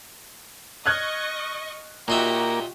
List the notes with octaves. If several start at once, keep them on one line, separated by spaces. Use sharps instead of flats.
D#5 C#6 F6 F#6 G#6
A#2 A#3 D#4 F#4 G4 E5